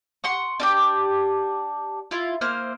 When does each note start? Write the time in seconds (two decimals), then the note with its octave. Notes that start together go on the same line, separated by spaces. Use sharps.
0.24 F#5 C6 C#6
0.60 D4 F4 G4
2.11 E4 F4
2.41 A#3 E4 C5 F6